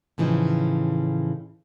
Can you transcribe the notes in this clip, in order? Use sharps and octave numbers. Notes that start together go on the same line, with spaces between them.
A2 C#3 E3 F3 D#4